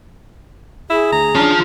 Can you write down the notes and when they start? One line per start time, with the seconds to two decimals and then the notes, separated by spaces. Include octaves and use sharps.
0.90 E4 G#4
1.12 D2 A#5
1.35 C#4 D4 F4 A5